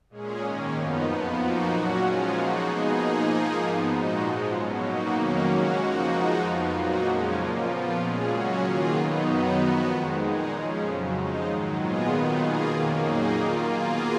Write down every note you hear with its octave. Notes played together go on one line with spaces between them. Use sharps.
A#2 G#3 C#4 G#4
G#2 D#3 A#3 C#4
F#2 F3 B3 D#4
F2 F3 B3
F3 A#3 D#4 F#4
A#2 F#3 C#4 F#4
F3 G#3 C#4 F4 G#4
F3 A#3 D#4 F#4
B2 G#3 B3 D#4 G#4
G#2 F3 A#3 D#4 G#4
F3 A#3 D#4 G#4
G#2 F3 B3
A#2 G#3 D#4 F#4
G#2 F3 G#3
B2 F#3 C#4
B2 A#3 D#4 F#4
F2 D#3 F#3 A#3 C#4
C#3 G#3 C#4 F#4
F3 A#3 D#4 F#4
F3 G#3 D#4 F#4
F2 F3 B3 F4
A#2 F#3 A#3 D#4 F#4
F2 C#3 F3 G#3 C#4
A#2 F3 A#3
F3 B3 F4
A#2 G#3 C#4 G#4
C#3 F#3 C#4 F#4
D#3 A#3 F4 G#4
B2 F#3 B3 D#4
F#2 D#3 F#3 B3 D#4
F3 B3 F#4
F2 D#3 G#3
A#2 G#3 D#4 G#4
C#3 F3 G#3 C#4
F2 C#3 F#3
F3 G#3 D#4
G#2 D#3 F#3
A#2 G#3 B3 F4 G#4
D#3 F#3 B3 D#4
B2 A#3 F4 G#4
F2 D#3 A#3 C#4
A#2 F#3 A#3 D#4 G#4
D#3 A#3 F4
B2 A#3 F4 G#4